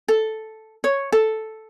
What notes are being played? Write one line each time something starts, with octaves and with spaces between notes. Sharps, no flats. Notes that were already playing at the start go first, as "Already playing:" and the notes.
A4
C#5
A4